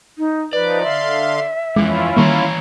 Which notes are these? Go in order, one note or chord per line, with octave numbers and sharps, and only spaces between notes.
D#4
F3 D#4 B4 D5
D3 E5 F5 C6
F2 E3 G#3 C#4 E4 F4
D#3 E3 G3 A#3 C#5 A#5